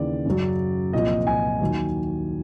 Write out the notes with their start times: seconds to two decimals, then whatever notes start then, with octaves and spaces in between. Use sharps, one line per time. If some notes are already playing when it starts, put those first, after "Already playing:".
Already playing: D#2 C#3 E3 D5
0.26 F#2 C#3 F#3
0.93 C2 A#2 F3 D#5
1.27 G#5
1.61 D#2 D#3 F#3